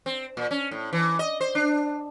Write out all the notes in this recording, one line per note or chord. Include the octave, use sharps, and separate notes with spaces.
C4
A#2
C#4
A2
E3
D#5
C5
D4